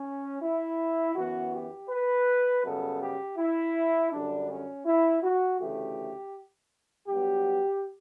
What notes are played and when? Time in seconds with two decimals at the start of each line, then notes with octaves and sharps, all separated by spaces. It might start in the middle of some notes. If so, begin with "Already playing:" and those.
Already playing: C#4
0.42 E4
1.15 F#2 E3 B3 F#4
1.52 G4
1.90 B4
2.63 F#2 C#3 G3 B3 A4
3.01 G4
3.38 E4
4.11 F#2 D3 G3 D4
4.49 C#4
4.85 E4
5.23 F#4
5.59 D2 C#3 E3 A3 G4
7.07 G2 F#3 B3 G4